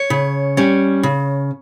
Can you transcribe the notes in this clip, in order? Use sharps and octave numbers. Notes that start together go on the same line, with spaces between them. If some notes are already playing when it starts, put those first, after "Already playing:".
Already playing: C#5
C#3
G3 C#4
C#3